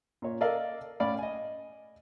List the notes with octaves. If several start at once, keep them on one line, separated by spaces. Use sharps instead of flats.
A#2 C#5
A4 A#4 D5 D#5 F5
A2 C#4 D5 F5 B5
D#5 G#5